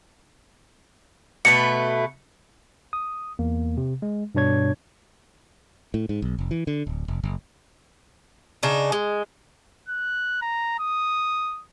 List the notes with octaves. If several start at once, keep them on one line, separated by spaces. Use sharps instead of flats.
B2 A3 B4 C#7
D#6
E2 A#3
C3
G#3
G2 B2 D4 C#5 G#6
A2
G#2
B1
F1
E3
D3
D1
F1
F#1
C#3 D4 D#4
G#3
F#6
A#5
D#6